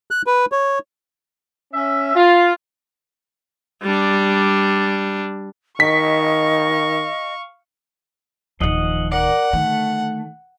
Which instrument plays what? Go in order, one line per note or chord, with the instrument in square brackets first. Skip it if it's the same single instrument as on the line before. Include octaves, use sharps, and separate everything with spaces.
[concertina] F#6
B4
C#5
[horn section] C#4 E5
F4
[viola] G3 D4
[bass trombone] D#3 [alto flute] D#5 [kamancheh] F5 C#6 [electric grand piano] B6
[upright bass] D1 D#3 [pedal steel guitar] F3 D#5 F#5
[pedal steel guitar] A#4 D5 [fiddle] F#5
[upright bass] D3 D#3 [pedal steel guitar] A3